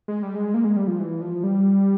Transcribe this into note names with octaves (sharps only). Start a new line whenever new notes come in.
G#3
G3
G#3
A#3
G#3
G3
F3
E3
F3
G3